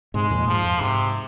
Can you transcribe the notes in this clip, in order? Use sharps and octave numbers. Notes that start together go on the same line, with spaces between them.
G#2 C3 G#3
F2 A#2
G#2 F3
F2
G#2 C3